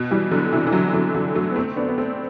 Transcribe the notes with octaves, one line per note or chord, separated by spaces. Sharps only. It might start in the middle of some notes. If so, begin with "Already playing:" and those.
Already playing: B2
E3 G3
D3 F#3
C3 E3
E3
D3 F#3
D3 F#3
D3 F#3
F#3 A3
B3
A3 C4
B3 D4
B3
A3 C4